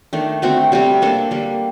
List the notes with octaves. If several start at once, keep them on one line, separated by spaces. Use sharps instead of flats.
D#3 A3 D4
D3 A3 C4 F#4
C3 G3 C4
A#3 D4 A4
D3 G3 A#3